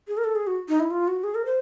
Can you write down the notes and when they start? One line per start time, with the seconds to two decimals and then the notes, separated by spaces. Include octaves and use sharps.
0.08 G#4
0.18 A#4
0.24 A4
0.35 G#4
0.47 F#4
0.69 D#4
0.80 E4
0.91 F4
1.08 F#4
1.24 G#4
1.35 A#4
1.46 C5